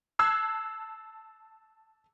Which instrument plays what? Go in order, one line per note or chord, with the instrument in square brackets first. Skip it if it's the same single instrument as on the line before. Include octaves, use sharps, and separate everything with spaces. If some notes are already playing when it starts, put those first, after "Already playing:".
[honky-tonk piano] A5 E6 F#6 G#6 C7